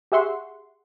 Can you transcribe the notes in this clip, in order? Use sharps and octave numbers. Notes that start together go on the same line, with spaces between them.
G4 G#4 E5 F#5 C6 C#6